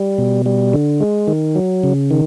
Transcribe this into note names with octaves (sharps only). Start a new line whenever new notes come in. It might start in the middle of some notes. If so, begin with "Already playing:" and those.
Already playing: G3
B2
G3
D3
G#3
D#3
F#3
C#3
D#3